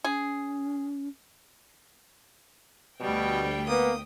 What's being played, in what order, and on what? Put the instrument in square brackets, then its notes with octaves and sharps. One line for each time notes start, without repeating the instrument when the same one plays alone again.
[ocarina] C#4 [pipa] G#4
[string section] D2 G5 [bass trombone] B2 [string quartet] G3
[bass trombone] A#3 [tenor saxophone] B3 [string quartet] D#6